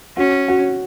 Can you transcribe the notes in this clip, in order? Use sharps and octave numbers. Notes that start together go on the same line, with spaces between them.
C#4 F#4
F#4